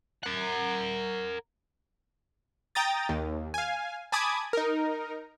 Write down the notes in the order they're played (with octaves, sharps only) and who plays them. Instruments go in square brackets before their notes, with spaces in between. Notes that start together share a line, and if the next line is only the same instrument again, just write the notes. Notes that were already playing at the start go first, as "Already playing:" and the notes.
[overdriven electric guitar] A#4 F#5
[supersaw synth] G5 A#5 D#6 A6
D#2
F5 G#5
G#5 A5 B5 D6 D#6 G#6
D#4 A#4